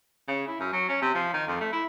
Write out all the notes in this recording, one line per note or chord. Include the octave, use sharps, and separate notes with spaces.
C#3
E4
F#2
F#3
C#4
C3
F3
D#3
F2
A3
E4